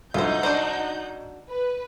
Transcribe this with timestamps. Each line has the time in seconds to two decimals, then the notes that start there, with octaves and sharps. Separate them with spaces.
0.14 C2 F#2 D3 D#4 F4 C5 F#5 G6
0.43 D4 F#4 C5
1.50 B4